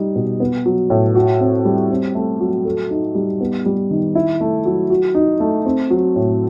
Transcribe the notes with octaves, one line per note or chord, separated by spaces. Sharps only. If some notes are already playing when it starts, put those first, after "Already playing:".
Already playing: G3 D#4
B2
B3
F#3
A2
F#4
C4
G3
C4
A3
F#3
A4
D#4
G3
B3
G3
D#3
E4
A3
F#3
F#4
D#4
A3
C4
F#3
A2